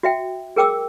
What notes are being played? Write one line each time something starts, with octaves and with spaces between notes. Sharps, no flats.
F#4 E5 G5
G#4 A#4 G5 D6 E6